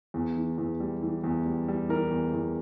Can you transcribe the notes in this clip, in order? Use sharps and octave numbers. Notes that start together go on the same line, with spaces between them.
E2
E3
E2
G3
E3
E2
G3
G3
E3 A#4
E2
E2